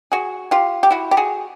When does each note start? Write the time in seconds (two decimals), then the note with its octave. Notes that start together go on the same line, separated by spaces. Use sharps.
0.12 F#4 G#4
0.51 F4 G4
0.83 G4
0.91 E4 F#4
1.11 G4
1.17 F#4 G#4